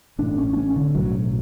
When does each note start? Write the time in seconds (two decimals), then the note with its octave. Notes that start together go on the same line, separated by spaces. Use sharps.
0.19 A1 A2 D4
0.38 C#4
0.53 D4
0.57 C#4
0.76 D3
0.95 B1 A2 F#3